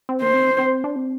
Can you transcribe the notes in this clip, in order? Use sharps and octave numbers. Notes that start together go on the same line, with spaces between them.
C4
A#3 C5
C4
C4
D4
C4